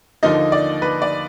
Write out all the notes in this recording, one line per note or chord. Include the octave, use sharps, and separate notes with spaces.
D#2 D3 F3 A#3 D#4 D#5
D5
B4
D5